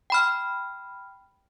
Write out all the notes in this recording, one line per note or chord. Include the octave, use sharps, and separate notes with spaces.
G5 B5 F6